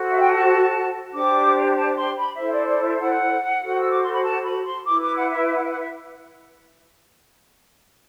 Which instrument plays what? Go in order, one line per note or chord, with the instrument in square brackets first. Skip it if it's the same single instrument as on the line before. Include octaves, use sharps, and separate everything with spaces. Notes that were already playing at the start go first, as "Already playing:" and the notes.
Already playing: [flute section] F#4 A4 C5
E5
G5
A5
D4 G4 C5 D6
A5
C6
B5
E4 A4 C5 E5
D5
D5
E5
F#5
F#4 A4 C5
E6
D6
C6
B5
A5
B5
C6
E4 B4 D6
D6
F#5
E5
E5
F#5
E5
F#5
E5